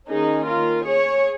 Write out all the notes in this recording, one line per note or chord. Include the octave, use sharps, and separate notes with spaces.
D#3 A#3 C#4 D#4 G#4
F4 A#4
G#4 C#5